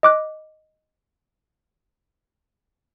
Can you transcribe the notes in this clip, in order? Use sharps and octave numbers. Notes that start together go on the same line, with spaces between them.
D#5 D6 F#6